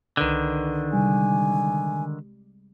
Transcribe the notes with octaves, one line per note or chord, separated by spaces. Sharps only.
C2 D3 D#3 B4 G6
C3 G3 G#3 G#5